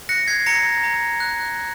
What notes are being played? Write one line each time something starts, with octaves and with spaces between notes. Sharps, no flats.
F#6 A#6 C#7
G#6 C7
A#5 A#6 C#7
A#5
F#6